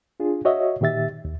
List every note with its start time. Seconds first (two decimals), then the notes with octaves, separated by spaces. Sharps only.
0.20 D4 F4 G#4
0.45 F#4 C#5 D#5 E5
0.81 A#2 D#3 G4 E5 A6
1.25 D#2